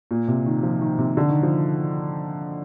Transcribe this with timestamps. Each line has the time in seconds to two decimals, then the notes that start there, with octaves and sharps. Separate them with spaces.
0.11 A#2
0.28 C3
0.46 D#3
0.63 F3
0.81 D#3
0.98 C3
1.17 D3
1.29 D#3
1.43 F3